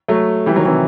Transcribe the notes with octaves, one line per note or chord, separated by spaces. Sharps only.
F#3 A3
E3 G3
D#3 F#3
C3 E3